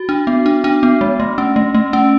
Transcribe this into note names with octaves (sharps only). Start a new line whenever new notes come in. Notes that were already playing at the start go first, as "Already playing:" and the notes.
Already playing: F#4
D4
B3
D4
D4
B3
G#3
A3
C#4
A3
A3
C#4